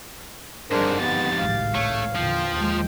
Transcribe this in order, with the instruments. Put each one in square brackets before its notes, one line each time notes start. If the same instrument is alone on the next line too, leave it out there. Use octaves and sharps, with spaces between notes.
[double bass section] G1 G3 [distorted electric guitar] F2 G#2 [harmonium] D4 A#4 C5 [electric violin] G#4
[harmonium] B3 [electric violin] G4 A6
[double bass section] G#1 C#2 A2 [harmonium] F5
[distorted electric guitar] A3 [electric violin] C#5
[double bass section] E2 A#2 D3 [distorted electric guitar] F3 [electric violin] F4 G5
[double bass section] D#2 G#3